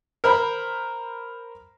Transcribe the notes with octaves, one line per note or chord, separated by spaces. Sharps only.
A#4 C5 B5